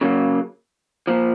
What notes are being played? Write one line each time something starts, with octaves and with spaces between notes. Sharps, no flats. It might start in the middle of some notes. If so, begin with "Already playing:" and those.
C#3 F#3 A#3
A#2 F3